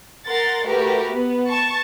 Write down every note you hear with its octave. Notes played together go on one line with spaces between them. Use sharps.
A#4 F#5 C6 A6
A3 F#4 G4 A#4 B4
B3
A5 C#6